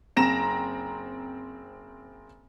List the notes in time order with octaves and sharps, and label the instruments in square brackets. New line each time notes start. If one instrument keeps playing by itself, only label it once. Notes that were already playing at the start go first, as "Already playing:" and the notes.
[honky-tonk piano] F#1 C4 A#5 A#6 E7